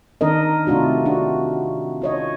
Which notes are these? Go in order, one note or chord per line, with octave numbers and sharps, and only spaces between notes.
D#3 D4 A#4 D#5
C3 A3 D4 F4 F#4
D4 F#4
F4 C#5 D#5